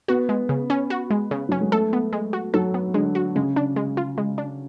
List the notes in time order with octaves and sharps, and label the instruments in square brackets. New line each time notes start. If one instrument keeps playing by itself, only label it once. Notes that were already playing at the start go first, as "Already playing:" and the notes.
[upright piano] B3 [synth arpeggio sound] F#4
[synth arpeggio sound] G#3
C#3
C#4
F#4
G#3
C#3
[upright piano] F#3 [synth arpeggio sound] C#4
[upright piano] G#3
[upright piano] A3 [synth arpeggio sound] A4
[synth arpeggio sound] B3
G#3
F#4
[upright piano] F#3 [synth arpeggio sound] A4
[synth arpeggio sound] B3
[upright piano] D3 [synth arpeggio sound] G#3
[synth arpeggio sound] F#4
[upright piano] C#3 [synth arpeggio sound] G#3
[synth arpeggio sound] D4
G#3
F4
G#3
D4